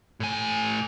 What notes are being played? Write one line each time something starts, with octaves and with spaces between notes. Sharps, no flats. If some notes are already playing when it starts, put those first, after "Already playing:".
A2 G#5